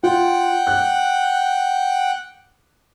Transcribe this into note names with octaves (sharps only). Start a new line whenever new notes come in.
F4 F#5 G5
F#6